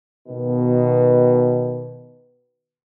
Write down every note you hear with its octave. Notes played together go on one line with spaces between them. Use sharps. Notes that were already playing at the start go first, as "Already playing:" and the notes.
B2 D#3